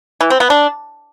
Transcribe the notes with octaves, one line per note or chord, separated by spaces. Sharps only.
E3
C4
B3
D4